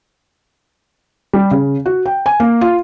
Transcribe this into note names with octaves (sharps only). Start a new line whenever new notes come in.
G3
C#3
F#4
G5
G#5
A#3
F4